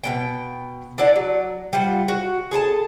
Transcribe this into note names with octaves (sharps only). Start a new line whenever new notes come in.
B2 B3 G5
D4 E4 D5 F#5
F#3
G3 F4 F#5
F#4
G#4 A4 G#5 A5